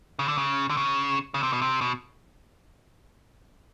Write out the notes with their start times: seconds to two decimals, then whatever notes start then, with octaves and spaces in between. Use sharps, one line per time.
0.19 C#3
0.28 D3
0.38 C#3
0.70 D3
0.77 C#3
1.34 C#3
1.43 C3
1.53 B2
1.62 C3
1.81 B2